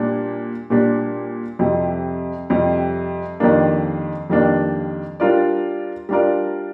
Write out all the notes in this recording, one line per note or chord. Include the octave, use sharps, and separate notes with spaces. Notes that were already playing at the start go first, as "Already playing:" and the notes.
Already playing: A#2 G3 D4 G4
A#2 G3 D4 G4
F2 C3 G3
F2 C3 G3
F2 D#3 G3 A#3 D4
F2 D#3 G3 A#3 D4
G3 D4 F4 A#4 D5
G3 D4 F4 A#4 D5